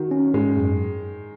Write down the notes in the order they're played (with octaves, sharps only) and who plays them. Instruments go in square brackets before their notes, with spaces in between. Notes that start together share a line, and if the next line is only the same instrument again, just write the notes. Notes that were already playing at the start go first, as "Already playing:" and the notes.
Already playing: [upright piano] D#3 [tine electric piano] F#4
[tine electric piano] C#4
[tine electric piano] G#2 [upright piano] G#3
[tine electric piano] F#2